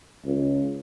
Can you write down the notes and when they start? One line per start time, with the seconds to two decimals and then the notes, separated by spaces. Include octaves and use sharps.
0.25 C#2